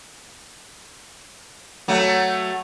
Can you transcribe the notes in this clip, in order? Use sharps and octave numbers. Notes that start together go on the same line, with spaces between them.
F#3 A3